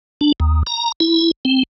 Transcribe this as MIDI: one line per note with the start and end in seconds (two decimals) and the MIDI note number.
0.21 0.32 62
0.40 0.63 39
0.67 0.92 82
1.00 1.31 64
1.45 1.63 60